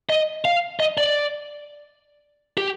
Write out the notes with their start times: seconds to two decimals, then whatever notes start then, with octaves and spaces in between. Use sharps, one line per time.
0.10 D#5
0.45 F5
0.80 D#5
0.98 D5
2.58 G4